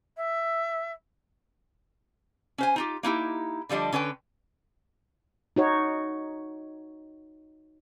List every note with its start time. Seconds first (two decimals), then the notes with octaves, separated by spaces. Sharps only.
0.17 E5
2.58 C#4 C5 G#5
2.76 D#4 F4 G4
3.03 A#3 D#4 E4 G4
3.69 D3 F3 G3 D4 D#5
3.92 D3 C#4 B4 G5
5.56 D#4 F#4 C#5